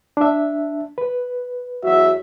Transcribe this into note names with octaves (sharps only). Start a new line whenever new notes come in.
D4 E5
B4
E2 F#3 F#4 E5